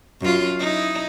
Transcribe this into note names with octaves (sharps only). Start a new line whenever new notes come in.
F#2 F4
D#4 E4